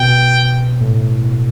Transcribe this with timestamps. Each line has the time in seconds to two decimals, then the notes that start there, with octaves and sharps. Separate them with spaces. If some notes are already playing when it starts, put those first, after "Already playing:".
Already playing: B2 G5
0.81 A2